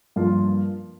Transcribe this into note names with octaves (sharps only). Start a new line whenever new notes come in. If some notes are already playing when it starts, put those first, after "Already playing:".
G2 F3 A#3 F4